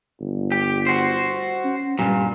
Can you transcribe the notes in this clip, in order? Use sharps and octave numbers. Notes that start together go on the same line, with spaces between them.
G1
G4
F#4 C5
C#4
G2 A#2 G3